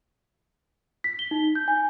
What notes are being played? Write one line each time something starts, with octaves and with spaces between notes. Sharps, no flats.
B6
G7
D#4
G6
G#5